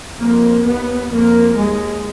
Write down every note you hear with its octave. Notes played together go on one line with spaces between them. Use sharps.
F2 A#3
D#2 B3
F2 A#3
D#2 G#3